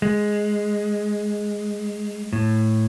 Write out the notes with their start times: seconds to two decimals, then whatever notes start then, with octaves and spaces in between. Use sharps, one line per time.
0.02 G#3
2.33 A2